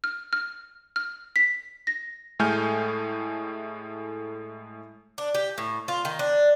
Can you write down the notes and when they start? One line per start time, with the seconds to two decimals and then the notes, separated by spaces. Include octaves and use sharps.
0.04 F6
0.33 F6
0.96 F6
1.36 B6
1.87 A#6
2.39 A2 G#3 A3 G#5 F6 G6
5.18 D4
5.34 G4
5.58 A2
5.88 F4
6.05 D#3
6.19 D4